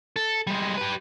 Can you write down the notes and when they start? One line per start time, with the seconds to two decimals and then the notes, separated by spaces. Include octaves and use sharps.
0.16 A4
0.47 G3 G#3
0.77 G4 B4